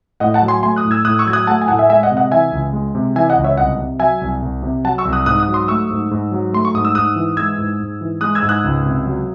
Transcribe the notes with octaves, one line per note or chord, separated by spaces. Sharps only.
A2 D#5 F#5
F#5 A5
F#3
G#5 C6
A3 G#5 C6
D#6 F#6
A2
E6 G#6
A2 D#6 F#6
C#6 E6
F#3 G#6
D#6 F#6
A3 F#5 A5
G#5
A2 F#5 A5
E5 G#5
G#3 E5 G#5
D#5 F#5
C3
D#5 F#5
E3 E5 G#5
C#2
G#3
C3
E3 E5 G#5
D#5 F#5
C#2
C#5 E5
C2 D#5 F#5
C3
F#3 E5 G#5
C2
C2
C3
F#3 F#5 A5
C#6 E6
C2
D#6 F#6
G#2 D#6 F#6
D#6 F#6
F#3
C6 D#6
A3 C#6 E6
G#2
G#2
F#3
A3 C6
C#6
G#2 D#6
E6
G#2 D#6 F#6
E3
G#3 E6 G#6
G#2
G#2
E3
G#3 D#6 F#6
E6 G#6
G#2
D#6 F#6
C#2
C3
F#3